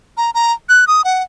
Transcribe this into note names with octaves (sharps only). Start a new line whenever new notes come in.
A#5
A#5
F#6
D#6
F#5